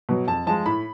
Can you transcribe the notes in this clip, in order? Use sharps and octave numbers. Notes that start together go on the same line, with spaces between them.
B2 F#3
F2 A5
F3 G#3 A5
A2 B5